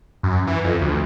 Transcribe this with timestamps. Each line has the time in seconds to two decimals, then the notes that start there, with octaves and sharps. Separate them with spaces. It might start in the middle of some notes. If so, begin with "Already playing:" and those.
0.23 F#2
0.47 E3
0.65 F2
0.81 D2